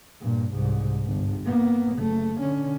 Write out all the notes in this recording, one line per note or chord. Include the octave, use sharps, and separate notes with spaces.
G2 A#2
C2 G#2
G1
A#3 B3
F#1 A3
D3 C#4